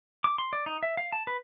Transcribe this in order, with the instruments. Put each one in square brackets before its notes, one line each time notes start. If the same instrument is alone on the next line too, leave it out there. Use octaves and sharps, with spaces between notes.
[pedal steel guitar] D6
C6
D5
D#4
E5
F5
A5
B4